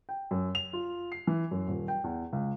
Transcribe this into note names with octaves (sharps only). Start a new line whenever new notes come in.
G5
F#2
F7
F4
C7
E3
F#2
D#1
G5
E2
C#2